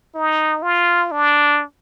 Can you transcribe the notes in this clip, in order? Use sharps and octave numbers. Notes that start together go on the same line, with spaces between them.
D#4
F4
D4